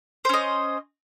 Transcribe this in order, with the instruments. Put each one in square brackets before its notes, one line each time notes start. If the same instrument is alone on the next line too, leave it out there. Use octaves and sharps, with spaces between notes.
[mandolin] C5
C#4
D#5